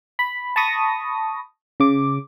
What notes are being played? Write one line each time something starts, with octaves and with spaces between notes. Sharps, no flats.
B5
A5 B5 C#6 D#6 A#6
C#3 D6